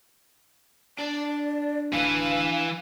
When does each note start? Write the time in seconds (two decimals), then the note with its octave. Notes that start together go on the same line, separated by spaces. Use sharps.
0.98 D4 D5 A5
1.93 D1 E3 B4 F5